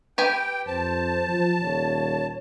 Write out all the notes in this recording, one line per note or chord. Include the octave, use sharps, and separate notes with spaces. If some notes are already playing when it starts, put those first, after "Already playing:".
G4 B4 G5 G#5
F2 C5 A5
F3
D#1 C#5